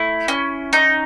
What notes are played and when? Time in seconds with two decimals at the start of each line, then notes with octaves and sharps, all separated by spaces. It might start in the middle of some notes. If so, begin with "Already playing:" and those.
Already playing: A3 E4
0.28 C#4
0.73 D#4